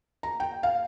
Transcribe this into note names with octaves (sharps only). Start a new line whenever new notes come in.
A#5
G5
F5